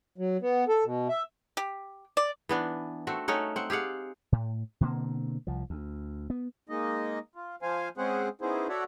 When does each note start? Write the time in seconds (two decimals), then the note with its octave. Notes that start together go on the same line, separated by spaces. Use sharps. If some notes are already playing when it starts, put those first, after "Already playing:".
0.18 F#3
0.42 B3
0.68 A4
0.84 B2
1.09 E5
1.57 G4
2.17 D5
2.49 E3 B3 D4
3.07 A3 C4 F#4
3.28 A3 C#4 D#4 F#5
3.56 C4 F#5
3.70 G4 G#4 F5 F#5
4.32 A2
4.81 B2 D3 A#3 C4
5.47 C2 F3
5.70 D2
6.30 B3
6.69 G#3 A#3 D#4 D#5
7.35 F4
7.62 F3 C5 F5 G#5
7.97 G#3 C4 C#4 G#4 C5 F#5
8.41 B3 C#4 D#4 E4 G#4 C5
8.69 F#4 A4 C#5 D5 E5 F#5